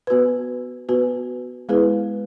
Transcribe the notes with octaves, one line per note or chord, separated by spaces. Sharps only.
B3 F#4 B4
B3 F#4 B4
G#3 B3 E4 G#4 B4